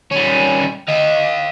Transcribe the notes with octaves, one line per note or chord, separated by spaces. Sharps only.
G3 C#4
D#5 F5